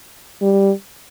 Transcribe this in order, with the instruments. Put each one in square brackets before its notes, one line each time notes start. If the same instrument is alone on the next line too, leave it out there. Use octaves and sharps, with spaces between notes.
[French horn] G3